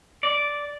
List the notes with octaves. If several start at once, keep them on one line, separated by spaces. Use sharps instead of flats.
D5